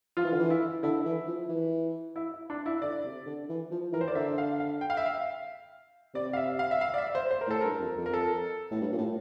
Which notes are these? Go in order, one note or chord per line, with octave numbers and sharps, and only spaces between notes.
F3 F4
E3
D3
E3
E4
D3 E4
E3
F3
E3
E4
D4
E4
D3 D5
C3
D3
E3
F3
E3 A#4
C5
D5
D3 E5
F5
F5
G5
F5
E5
F5
C3 D5
F5
E5
F5
E5
F5
D5
E5
C5
C5
A#4
A2
A4
G2 A#4
F2
F2
A#4
A4
A2
G2
A#2
A2